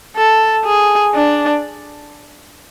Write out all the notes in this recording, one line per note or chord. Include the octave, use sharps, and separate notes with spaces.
A4
G#4
D4